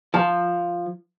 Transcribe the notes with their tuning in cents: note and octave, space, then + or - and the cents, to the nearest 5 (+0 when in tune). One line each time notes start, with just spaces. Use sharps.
F3 +0 A5 +0